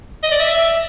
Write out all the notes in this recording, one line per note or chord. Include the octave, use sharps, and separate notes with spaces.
D#5
D5
E5